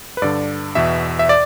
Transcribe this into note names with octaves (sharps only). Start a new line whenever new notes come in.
B4
G2 D3 D5
E2 B2 E5
E5
D5